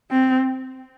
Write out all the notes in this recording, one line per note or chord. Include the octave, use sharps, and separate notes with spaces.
C4